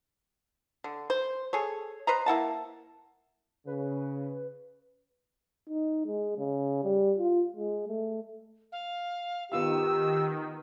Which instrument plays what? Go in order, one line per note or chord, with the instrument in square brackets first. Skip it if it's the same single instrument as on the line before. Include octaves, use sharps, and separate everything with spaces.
[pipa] D3
C5
G#4 A4 C#5
B4 C5 D#5 A#5
A#3 E4 F#5 A5
[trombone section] C#3 [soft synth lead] B4
[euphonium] D#4
G#3
C#3
G3
F4
G#3
A3
[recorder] F5
[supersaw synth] D#3 [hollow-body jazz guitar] B3 F4 F5 [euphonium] G4 [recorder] E6